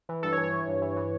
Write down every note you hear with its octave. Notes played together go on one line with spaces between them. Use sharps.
E3
G2 A4
C#5
E3
C#5
E3
G2
E3
E3